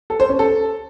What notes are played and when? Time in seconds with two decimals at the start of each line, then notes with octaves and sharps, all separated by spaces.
0.10 A4
0.20 C5
0.29 C#4
0.39 A4